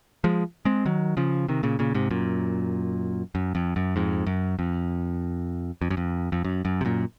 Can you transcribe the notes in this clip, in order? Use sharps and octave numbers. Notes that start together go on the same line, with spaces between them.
F3 G#3
G#3 C4
D#3 F#3
C#3 F3
C3 D#3
A#2 C#3
A#2 C#3
G#2 C3
F#2 A#2
F#2
F2
F#2
F2 G#2
F#2
F2
F2
F#2
F2
F2
F#2
F#2
C3
F#2 A#2